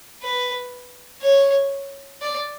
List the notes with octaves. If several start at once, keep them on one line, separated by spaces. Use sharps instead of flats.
B4
C#5
D5